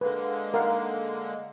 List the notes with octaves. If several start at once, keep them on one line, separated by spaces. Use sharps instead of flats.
D3 G#3 A#3 B4
A#4 F5 F#5